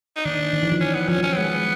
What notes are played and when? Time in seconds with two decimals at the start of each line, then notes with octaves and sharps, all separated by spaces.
0.16 D#4
0.25 D#3 D4
0.53 D#3
0.63 E3
0.72 F3
0.81 C#4
0.95 B3
1.09 F3 C#4
1.19 F#3 C#4
1.33 C4
1.37 G#3 B3